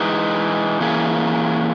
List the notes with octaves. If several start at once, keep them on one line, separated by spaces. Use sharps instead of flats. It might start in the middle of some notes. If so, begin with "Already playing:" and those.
Already playing: E3 G#3 D#4
E3 A#3 C#4 G#4